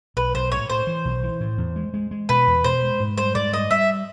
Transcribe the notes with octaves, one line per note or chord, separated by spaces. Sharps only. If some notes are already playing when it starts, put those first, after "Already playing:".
B1 B4
B1 C5
A2 C#5
A2 C5
E3
B1
E3
A2
E2
G#3
G#3
G#3
B2 B4
E2
B2 C5
G#3
G#2
G3 C5
G#2 D5
G3 D#5
G3 E5